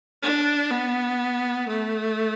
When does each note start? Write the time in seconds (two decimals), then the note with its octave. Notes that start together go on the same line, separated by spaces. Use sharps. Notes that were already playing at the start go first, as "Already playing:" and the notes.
0.23 D4
0.71 B3
1.68 A3